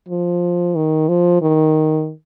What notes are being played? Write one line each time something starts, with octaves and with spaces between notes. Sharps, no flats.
F3
D#3
F3
D#3